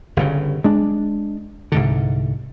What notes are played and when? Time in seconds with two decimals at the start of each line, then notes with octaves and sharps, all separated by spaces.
0.17 G1 G2 C#3
0.64 G#3 D4
1.72 C2 G#2 D3